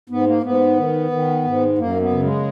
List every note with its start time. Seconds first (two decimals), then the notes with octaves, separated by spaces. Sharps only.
0.09 G#2 B3
0.27 A#3
0.43 G#2 B3
0.77 D#3
1.11 D#3
1.44 G#2
1.78 F#2 A#3
2.01 B3
2.11 C#3
2.23 G#3